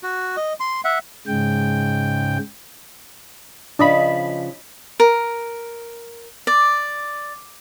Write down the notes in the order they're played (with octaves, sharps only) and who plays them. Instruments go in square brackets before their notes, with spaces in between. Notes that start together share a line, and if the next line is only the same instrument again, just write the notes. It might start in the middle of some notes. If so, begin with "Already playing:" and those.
[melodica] F#4
D#5
C6
E5 F#5
[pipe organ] G#2 C#3 G#3 G5
[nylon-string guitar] C#3 F3 A5 [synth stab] D4 D#5 B5
[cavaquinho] A#4
D5